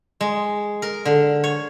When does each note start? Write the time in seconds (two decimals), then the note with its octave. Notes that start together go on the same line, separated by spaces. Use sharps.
0.21 G#3
0.82 A#4
1.05 D3
1.44 C#5